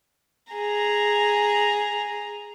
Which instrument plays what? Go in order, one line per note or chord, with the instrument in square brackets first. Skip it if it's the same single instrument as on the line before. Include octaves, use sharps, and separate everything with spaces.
[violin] G#4 A#5